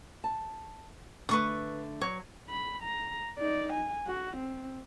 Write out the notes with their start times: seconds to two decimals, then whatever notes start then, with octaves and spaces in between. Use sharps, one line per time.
0.24 A5
1.29 D3 A3 B4 C#6 D#6
2.01 F#3 C#5
2.49 B5
2.83 A#5
3.38 D#4 D5
3.73 G#5
4.07 F#4
4.37 C4